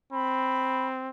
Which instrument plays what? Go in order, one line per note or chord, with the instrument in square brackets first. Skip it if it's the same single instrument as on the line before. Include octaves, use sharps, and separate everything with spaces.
[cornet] C4 [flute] B5